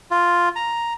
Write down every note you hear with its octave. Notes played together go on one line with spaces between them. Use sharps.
F4
A#5